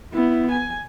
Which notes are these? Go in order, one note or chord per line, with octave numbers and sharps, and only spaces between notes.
B3 E4
G#5